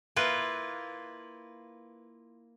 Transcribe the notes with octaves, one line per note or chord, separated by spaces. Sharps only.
A#3 E4 F4 B4